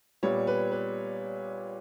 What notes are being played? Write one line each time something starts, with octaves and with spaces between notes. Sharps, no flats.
A#2 G3 B3 C#5
B4
B4